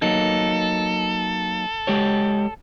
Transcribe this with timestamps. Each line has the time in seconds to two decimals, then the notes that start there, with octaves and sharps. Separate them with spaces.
0.02 F#3 A#3 D#4 A4
1.87 G#3 G4 C#5